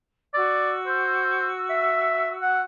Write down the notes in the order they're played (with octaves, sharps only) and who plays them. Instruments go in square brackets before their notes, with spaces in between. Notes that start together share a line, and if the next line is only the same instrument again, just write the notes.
[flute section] F#4 E6 [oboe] D5
[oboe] C5
E5
F#5